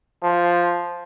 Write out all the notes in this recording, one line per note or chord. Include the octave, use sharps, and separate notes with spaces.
F3